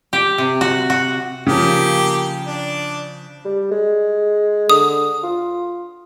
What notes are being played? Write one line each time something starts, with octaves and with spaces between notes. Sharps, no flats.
G4
C3
F#4
F#4
C#3 F3 A#3 G4
D4
G3
G#3
D3 D#6
F4